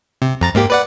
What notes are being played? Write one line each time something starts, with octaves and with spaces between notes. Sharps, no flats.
C3
F2 A#5 A6
G#2 A#3 G4
B4 D5 F#5